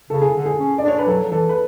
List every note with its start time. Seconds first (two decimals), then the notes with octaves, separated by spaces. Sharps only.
0.10 C#3 A4
0.21 G#4
0.34 D3
0.46 G#4
0.58 C#4
0.78 D5
0.83 D4 C#5
0.98 B4
1.07 F#3 A4
1.23 F#3
1.32 E3 A4
1.49 B4